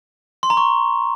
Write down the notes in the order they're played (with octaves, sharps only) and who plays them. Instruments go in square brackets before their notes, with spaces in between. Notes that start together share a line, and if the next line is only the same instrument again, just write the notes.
[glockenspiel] C6
A#5
C#6